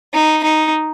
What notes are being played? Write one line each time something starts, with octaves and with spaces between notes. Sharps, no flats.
D#4
D#4